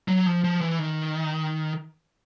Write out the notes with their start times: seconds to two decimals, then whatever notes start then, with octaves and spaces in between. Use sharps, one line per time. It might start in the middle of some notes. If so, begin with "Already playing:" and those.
0.08 F#3
0.26 F3
0.44 F3
0.61 E3
0.79 D#3